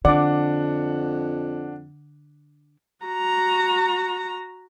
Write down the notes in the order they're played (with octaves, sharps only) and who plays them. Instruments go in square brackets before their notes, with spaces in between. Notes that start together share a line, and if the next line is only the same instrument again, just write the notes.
[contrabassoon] F2 [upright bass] D3 [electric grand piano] D4 F#5 [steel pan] D5 D6
[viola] F#4 A#5